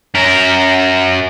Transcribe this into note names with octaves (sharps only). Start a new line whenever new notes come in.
F#2 A#4